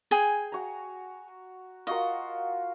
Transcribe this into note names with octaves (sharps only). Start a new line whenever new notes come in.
G#4 G5 G#5
F#4 A#5
F4 F#4 A#4 D#5